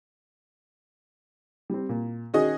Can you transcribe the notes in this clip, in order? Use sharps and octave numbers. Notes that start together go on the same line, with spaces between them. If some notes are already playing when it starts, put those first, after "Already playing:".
G3 C4
A#2
D#3 C#4 F#4 G#4 D#5